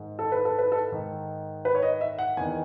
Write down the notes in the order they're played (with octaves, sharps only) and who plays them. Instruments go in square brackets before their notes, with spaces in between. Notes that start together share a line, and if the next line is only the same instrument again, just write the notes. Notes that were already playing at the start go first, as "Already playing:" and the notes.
Already playing: [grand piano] G#2 D#3
A4
B4
A4
B4
A4
G#2 D#3
B4
C#5
D#5
E5
F#5
E2 D#3 G#5